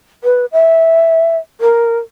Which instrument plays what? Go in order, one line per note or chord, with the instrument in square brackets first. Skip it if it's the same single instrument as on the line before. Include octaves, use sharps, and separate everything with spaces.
[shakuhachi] B4
E5
A#4